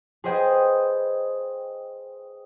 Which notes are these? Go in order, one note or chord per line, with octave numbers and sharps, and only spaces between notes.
G#4 B4 C5 D#5 G5